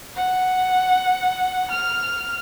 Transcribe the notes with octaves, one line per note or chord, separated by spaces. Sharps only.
F#5
F6